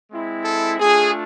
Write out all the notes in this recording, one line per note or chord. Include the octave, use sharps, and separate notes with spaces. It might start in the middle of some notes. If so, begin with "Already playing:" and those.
G#3 C4 E4
A4
A3 D4 F4 G#4